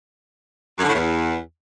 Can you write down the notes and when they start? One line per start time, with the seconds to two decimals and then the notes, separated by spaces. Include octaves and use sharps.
0.78 F#2
0.83 D3
0.89 A2
0.94 E2